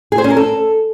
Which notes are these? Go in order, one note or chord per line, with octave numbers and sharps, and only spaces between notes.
G#4
C5
C#4
A#4
A4